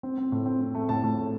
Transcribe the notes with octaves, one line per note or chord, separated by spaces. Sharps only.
C4
C4
A2
C4
C4
A3
A2 A5
A2
A3